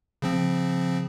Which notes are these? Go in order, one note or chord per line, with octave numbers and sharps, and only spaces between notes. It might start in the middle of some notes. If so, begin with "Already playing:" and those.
C#3 F3 C4